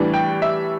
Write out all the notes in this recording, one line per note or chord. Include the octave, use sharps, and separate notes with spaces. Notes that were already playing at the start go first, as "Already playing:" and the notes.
Already playing: A2 E3 G3 D4
G5
E5